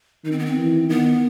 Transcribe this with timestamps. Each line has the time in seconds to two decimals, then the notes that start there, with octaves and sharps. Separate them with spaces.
0.25 D#3 D#4
0.32 C4
0.39 B3
0.46 C4
0.57 E3
0.89 D#3 B3